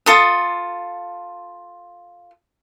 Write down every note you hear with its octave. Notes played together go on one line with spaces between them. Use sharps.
F4 A4 D#6